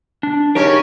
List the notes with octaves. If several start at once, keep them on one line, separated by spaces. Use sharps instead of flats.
D4
C#3 C#4 D#4 G4 A#4